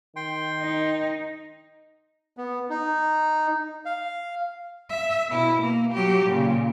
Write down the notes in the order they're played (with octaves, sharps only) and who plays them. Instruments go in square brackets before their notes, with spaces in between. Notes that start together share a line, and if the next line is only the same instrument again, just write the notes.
[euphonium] D#3 [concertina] G5 C6
[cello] D#4
[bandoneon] B3
D#4
F5
[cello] E5
B2 E4
A#3
F#3 G4
A#2 C#3